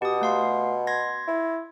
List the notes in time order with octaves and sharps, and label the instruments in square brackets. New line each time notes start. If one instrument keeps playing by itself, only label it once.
[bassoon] B2 [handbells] G4 D#6
[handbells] A3 F5 C6
C6 G#6 A#6
[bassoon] E4